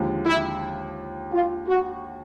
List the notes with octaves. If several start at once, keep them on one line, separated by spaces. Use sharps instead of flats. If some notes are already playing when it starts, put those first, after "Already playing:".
Already playing: D#2 D3 F3 G#3
E4
F4
F#4